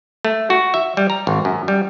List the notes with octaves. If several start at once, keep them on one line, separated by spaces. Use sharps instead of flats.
A3
F#4
E5
G3
A#5
G#1
F#2
G3